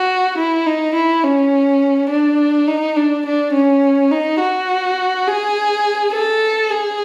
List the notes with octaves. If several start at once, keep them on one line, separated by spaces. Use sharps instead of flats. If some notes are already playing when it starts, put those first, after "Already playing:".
Already playing: F#4
E4
D#4
E4
C#4
D4
D#4
D4
D4
C#4
D#4
F#4
G#4
A4
G#4